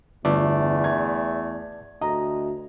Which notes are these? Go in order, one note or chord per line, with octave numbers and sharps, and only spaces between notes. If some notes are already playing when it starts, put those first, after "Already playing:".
G1 E2 A3 D5 E5 A5
G#6
D2 D#5 A#5